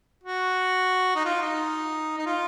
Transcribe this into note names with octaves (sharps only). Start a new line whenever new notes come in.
F#4
D#4
F4
D#4
D#4
F4